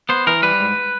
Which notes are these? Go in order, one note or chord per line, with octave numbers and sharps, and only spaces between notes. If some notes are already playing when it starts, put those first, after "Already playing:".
B3 C5
E3 A#4
G3 B4
G#2